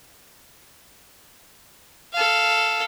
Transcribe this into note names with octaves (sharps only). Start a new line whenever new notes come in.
A4 F5